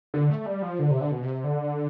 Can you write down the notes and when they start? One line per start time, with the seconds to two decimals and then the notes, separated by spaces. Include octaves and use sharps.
0.14 D3
0.30 A3
0.46 G3
0.62 F3
0.79 D3
0.91 C3
1.01 D3
1.11 B2
1.22 C3
1.44 D3